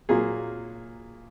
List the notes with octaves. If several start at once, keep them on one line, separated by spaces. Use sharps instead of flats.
A#2 F#3 A#3 G#4